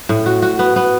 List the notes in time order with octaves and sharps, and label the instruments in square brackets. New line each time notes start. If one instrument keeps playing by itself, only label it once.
[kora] A2
F#4
F#4
B3
B3